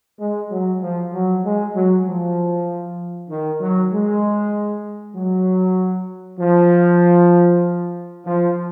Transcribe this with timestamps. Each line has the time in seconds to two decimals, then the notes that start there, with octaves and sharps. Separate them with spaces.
0.19 G#3
0.51 F#3
0.81 F3
1.13 F#3
1.44 G#3
1.74 F#3
2.06 F3
3.29 D#3
3.60 F#3
3.92 G#3
5.15 F#3
6.40 F3
8.26 F3